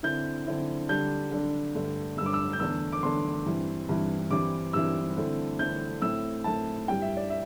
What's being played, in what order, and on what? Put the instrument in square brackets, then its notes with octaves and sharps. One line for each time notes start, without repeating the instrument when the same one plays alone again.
[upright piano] D3 C4 E4 G6
D3 C4 E4
D3 G3 D4 G6
D3 G3 D4
G2 D3 A3
G2 D3 A3 E6
D6
E6
G6
E2 D3 A3 D4 E6
D6
E2 D3 A3 D4 C6
G2 E3 C4 E4
G2 E3 C4 E4
G2 E3 G3 C4 E4 D6
G2 E3 G3 C4 E4 E6
D3 A3 C4 E4
D3 A3 C4 E4 G6
A2 A3 C4 E4 E6
A2 A3 C4 E4 A5
G2 G3 E4 G5
E5
D5
E5